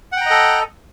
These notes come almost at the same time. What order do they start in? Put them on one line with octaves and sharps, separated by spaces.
F#5 G5 A#5 D#5 A4